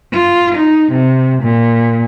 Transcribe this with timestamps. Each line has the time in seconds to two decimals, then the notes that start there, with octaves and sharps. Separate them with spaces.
0.12 F4
0.55 D#4
0.92 C3
1.43 A#2